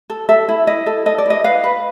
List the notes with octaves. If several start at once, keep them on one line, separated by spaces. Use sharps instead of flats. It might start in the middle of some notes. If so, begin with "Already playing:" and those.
A4
A4 E5
E4
E4 D#5
A4
A4 D#5
D5
E4 D#5
B4 F5
B4